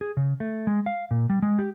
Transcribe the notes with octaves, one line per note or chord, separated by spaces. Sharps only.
G#4
C#3
A3
G#3
F5
A#2
G3
G#3
G4